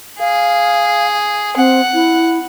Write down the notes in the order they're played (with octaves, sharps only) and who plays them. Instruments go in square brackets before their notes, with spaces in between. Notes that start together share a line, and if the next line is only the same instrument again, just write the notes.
[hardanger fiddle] G#4 [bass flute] F5
[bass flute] C4 [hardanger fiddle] F#5
[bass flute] E4